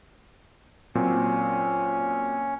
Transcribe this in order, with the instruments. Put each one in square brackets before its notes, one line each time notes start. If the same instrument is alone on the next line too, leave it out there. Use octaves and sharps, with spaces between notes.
[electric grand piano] A#2 F#3 C4 [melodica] C#4